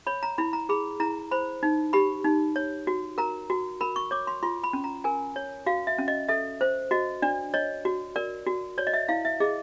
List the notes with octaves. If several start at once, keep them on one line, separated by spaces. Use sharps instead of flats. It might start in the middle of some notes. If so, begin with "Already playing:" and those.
C#5 B5
A#5
E4 B5
A#5
G#4 B5
E4 A#5
C5 B5
D#4
G4 B5
D#4
C#5
F#4
A#4 A#5
F#4
A#4 B5
C#6
C#5 D6
C6
F4 C6
B5
C#4
A#5
A#4 G#5
C#5
F#4 F5
E5
C#4
D#5
A4 E5
C5
F#4 D#5
D4 D5
C#5 D#5
F#4
A#4 D5
F#4
C#5 D5
D#5
E5
E4 F5
E5
G#4 D#5